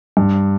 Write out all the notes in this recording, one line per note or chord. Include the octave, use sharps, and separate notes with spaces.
G2